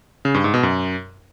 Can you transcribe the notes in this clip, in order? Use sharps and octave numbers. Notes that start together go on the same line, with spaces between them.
C#3
G2
G#2
B2
F#2